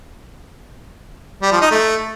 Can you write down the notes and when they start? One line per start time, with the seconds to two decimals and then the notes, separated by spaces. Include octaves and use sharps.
1.42 G3
1.52 F3
1.61 D#4
1.71 A3